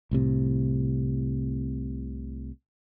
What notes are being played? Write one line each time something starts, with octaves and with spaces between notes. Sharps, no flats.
C2 A2 C3